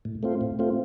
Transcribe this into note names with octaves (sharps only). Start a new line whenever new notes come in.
A2
A3 C4 F4
A2
A3 C4 F4